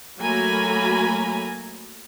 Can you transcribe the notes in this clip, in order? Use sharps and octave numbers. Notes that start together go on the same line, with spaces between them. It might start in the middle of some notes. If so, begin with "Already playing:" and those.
F#3 A3 A#3 G#5 A#5 B5